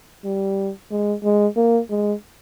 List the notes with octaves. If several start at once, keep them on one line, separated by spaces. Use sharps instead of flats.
G3
G#3
G#3
A#3
G#3